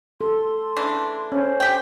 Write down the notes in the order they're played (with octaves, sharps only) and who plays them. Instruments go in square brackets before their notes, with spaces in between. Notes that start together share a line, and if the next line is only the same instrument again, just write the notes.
[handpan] A4 [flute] C6
[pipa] C#3 E3 D4
[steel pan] C#4 [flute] C5
[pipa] G4 G5